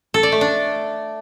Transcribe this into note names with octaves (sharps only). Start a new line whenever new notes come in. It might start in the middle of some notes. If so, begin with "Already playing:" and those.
A4
D5
A3
D4